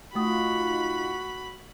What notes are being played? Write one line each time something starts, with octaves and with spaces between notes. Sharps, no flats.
A3 D#4 F4 F#4 B5 D#6